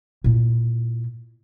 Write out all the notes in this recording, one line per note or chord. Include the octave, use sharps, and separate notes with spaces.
A#2 E4